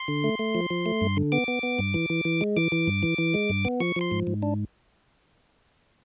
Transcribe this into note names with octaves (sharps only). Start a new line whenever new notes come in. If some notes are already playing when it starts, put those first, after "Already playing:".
Already playing: C6
D3
A3
A3
F3
F3
A3
G2
D3
B3 D6
B3
B3
G2
E3
E3
E3
G#3
E3 D6
E3
G2
E3
E3
G#3
G2
B3
F3 C#6
F3 C6
G#2
G#2
D4